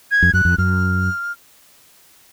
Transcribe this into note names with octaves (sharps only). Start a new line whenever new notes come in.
G#6
F2
F#2 F#6
F2
F#2 F6